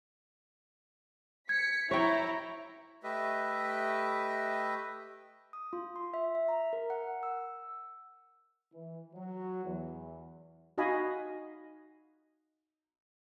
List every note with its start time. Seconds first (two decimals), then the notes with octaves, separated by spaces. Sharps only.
1.49 G#6 B6 C#7
1.91 E4 C#5 G5 A#5
3.03 A3 G4 B4 D#5 E5
5.53 D#6
5.73 F4
5.96 C6
6.14 E5
6.35 E5
6.48 A#5
6.73 A#4
6.90 F#5
7.23 E6
8.72 E3
9.14 F#3
9.64 E2
10.78 D#4 F#4 D#5 F5 G#5 B5